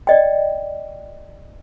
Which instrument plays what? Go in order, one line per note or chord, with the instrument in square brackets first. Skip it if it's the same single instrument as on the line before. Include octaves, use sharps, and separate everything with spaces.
[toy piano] D5 D#5 G5